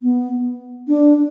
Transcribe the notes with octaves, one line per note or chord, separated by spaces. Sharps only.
B3
D4